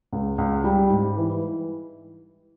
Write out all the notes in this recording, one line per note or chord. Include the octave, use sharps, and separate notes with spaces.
C#2
C#2
G3
G#2
E3